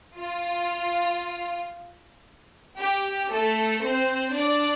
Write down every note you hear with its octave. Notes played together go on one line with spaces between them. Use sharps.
F4
G4
A3 A4
C4 C5
D4 D5